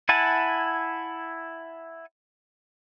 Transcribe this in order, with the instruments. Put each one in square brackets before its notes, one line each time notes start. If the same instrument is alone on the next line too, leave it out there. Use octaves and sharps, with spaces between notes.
[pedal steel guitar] E4 F#5 G#5 A5